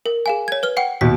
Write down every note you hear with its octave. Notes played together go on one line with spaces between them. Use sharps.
A#4
G#4 F5 G#5
C#5 G#6
B4 F6 G7
F#5 G5 C7
D#2 B2 B6